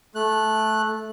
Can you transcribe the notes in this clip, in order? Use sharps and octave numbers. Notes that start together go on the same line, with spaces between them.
A3 F#6